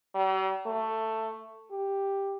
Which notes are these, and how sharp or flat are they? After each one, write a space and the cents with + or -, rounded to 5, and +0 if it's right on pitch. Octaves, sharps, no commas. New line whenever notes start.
G3 -45
A3 +10
G4 +5